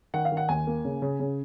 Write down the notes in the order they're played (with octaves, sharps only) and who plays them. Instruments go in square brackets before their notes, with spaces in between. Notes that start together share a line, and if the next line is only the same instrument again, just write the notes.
[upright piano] D#3 F#5
F5
D#3
F#5
D#2 G#5
A#3
C#3
C#3
C#3